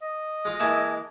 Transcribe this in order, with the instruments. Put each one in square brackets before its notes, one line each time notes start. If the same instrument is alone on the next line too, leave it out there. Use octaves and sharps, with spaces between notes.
[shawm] D#5
[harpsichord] G#3 F4
[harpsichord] E3 G#3 A#3 [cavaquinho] E5 G#5 A5